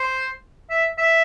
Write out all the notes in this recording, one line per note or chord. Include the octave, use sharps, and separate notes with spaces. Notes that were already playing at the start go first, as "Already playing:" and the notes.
Already playing: C5
E5
E5